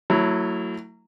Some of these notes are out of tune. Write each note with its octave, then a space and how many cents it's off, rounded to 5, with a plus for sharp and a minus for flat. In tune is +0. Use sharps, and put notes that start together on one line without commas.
F#3 +0 A3 +40 E4 +0